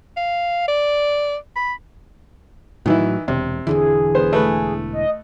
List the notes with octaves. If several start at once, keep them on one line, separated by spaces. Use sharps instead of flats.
F5
D5
B5
A2 D#3 E3 F#3 E4
E1 C3
E1 D3 E3 G#4
B3 C5
A3 B4
D#5